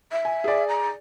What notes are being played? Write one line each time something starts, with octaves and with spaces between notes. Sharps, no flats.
E5
G#5
G#4 D5
A#5